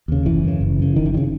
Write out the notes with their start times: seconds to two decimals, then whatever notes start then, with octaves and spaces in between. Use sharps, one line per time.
0.08 D#2 C#3
0.25 F#1 E3
0.44 F#2 C#3
0.61 F#1
0.79 F#2 C#3
0.96 F#1 D#3
1.06 E3
1.14 D#3
1.17 C#3